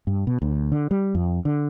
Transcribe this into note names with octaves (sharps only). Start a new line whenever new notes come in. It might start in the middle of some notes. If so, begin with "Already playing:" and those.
G2
B2
D2
D3
G3
F2
D3